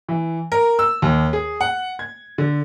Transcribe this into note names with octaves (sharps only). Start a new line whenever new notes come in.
E3
A#4
E6
D#2
G#4
F#5
G#6
D3